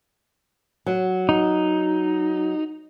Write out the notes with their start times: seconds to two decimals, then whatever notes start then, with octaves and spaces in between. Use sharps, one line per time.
0.86 F#3
1.29 D#4